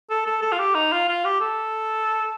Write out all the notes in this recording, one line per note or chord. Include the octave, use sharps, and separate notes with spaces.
A4
A4
A4
F4
G4
D#4
F4
F4
G4
A4